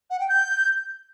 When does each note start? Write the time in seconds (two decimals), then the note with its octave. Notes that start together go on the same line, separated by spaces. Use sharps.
0.10 F#5
0.20 G5
0.29 G6